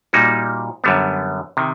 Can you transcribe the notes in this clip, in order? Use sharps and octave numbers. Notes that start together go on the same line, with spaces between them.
A#2 G3 A#3 D#4 F#4
F#2 D3 G3 B3
C3 D#3